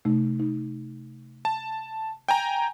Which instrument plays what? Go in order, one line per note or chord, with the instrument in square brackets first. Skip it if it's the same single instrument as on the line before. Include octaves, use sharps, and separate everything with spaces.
[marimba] C3 A3 D#4
D#4
[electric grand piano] A5
G5 G#5 A#5